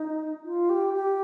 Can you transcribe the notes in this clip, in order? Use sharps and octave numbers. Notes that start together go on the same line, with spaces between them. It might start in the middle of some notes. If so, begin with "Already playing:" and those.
Already playing: D#4
F4
G4
G4